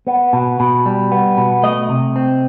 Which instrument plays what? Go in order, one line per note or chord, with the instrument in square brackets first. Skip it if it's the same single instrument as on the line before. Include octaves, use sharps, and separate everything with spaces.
[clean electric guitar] B3
B2
B2
G3
B3
B2
A3 D#5
C3
C4